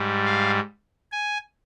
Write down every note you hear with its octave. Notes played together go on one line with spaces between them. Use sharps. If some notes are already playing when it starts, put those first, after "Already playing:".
Already playing: G#2 G3
F5
G#5